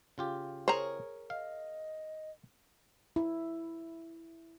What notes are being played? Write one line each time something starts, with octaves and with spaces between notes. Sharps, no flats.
C#3 F4 G4
G#4 A#4 C5 C#5 A#5
D#5 F5
E4